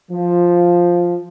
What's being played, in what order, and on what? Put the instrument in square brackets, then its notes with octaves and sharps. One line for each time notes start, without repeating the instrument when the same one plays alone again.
[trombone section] F3